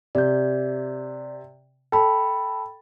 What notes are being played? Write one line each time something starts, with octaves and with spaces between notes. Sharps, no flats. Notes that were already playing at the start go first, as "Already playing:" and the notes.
C3 D5 G6
A4 G5 B5